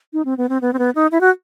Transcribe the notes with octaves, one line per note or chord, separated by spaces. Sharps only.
D#4
C4
B3
C4
B3
C4
B3
D#4
E4
F#4